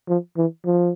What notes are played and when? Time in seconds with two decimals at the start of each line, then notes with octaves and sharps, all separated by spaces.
0.09 F3
0.37 E3
0.66 F3